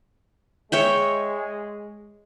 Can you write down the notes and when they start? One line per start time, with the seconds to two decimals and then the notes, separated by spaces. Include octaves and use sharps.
0.72 G#3 C#5 E5 G5